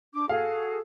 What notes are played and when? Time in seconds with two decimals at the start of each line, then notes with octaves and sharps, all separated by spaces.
0.14 D4 D6
0.29 F#4 G#4 A4 F5